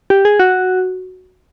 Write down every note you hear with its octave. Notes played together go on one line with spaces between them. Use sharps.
G4
G#4
F#4